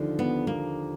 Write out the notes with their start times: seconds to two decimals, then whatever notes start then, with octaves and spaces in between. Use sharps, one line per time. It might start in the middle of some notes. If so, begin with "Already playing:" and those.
Already playing: D#2 D3 F3
0.19 B3
0.47 A#3